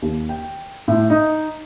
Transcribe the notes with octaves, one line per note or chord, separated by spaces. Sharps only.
D#2
G5
A2
D#4